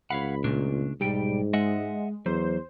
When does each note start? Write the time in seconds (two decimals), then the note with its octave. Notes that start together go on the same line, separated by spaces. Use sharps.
0.10 C#2 C#5 F5 F#5 B5
0.44 A#2 C#3 A3 D4
1.01 B1 G#2 G3 G5
1.53 G#3 D#5 E5 F#5
2.26 E2 F#3 C5